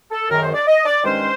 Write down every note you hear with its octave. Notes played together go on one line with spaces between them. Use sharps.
A4
F#2 D#3 G#3 A#4
C5
D5
D#5
D5
G2 D#3 G#3 C#4 C5